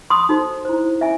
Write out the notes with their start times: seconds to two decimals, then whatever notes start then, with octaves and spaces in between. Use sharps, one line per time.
0.10 C6 D#6
0.29 D#4 F#4 A4 C5
0.65 E4 C5
1.01 C#4 E5 G#5